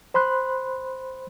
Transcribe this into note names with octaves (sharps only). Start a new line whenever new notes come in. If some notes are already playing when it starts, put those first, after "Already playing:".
C5 B5 C6 F#6